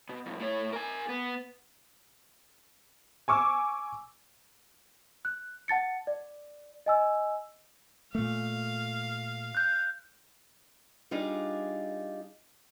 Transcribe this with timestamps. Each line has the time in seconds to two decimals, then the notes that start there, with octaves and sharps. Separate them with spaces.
0.09 B2
0.26 C2 F2
0.40 A2 C#5
0.73 A#4 G#5
1.09 B3
3.28 G#5 C#6 D6 E6
5.25 F#6
5.68 F#5 A5 A6 C#7
6.07 D5
6.86 D#5 G#5 E6
8.15 A#2 A3 F5
9.55 F#6 G6
11.11 G3 D4 D#4 F4 G#4